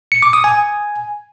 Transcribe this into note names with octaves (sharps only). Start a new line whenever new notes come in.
C#7
D6
D#6
G#5